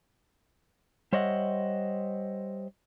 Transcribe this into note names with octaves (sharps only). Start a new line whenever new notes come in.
G3 C5 C#5 D#5 E5 F#5